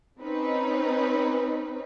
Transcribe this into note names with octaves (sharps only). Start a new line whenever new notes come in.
C4 C#4 D#4 B4